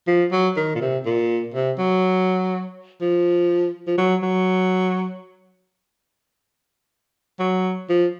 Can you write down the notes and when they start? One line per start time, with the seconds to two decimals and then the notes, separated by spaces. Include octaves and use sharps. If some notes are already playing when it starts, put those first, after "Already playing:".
0.07 F3
0.32 F#3
0.56 D#3
0.75 A#2
0.81 C3
1.06 A#2
1.54 C3
1.78 F#3
3.01 F3
3.87 F3
3.98 F#3
4.23 F#3
7.39 F#3
7.89 F3